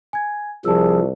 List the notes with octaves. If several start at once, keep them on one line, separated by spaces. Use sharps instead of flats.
G#5 G#6
C2 F3 G#4 A5 E6